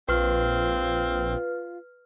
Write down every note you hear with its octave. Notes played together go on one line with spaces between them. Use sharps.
A#1 C4 F4 B4 F6